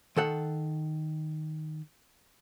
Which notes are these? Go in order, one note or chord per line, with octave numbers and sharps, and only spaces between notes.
D#3 A4 F#5